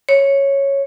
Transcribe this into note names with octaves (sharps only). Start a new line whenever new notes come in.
C#5